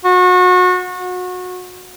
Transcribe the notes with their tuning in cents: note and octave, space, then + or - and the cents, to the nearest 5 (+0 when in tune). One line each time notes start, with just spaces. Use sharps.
F#4 -30
F#4 -30